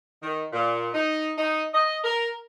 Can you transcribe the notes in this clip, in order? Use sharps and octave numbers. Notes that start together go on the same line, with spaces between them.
D#3
A#2
D#4
D#4
D#5
A#4